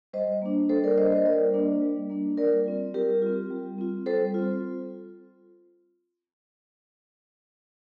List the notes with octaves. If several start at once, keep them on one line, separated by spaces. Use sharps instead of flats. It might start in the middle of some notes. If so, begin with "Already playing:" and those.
G3 C5 D#5
A#3 D4
G3 A4 C5
A#4 D5
A#3 D4 C5 D#5
C5 D#5
G3 A#4 D5
A#3 D4
G3
A#3 D4
G3 A#4 D5
C4 F4
G3 G4 A#4
C4 F4
G3
C4 F4
G3 A4 C5
C4 F4